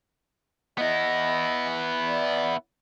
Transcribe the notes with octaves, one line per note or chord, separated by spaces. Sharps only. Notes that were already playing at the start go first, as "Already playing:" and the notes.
B3 E4 D#5
D5